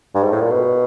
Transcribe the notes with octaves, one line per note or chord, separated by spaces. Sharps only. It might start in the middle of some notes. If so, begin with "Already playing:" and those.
G2
G#2
A2
A#2
B2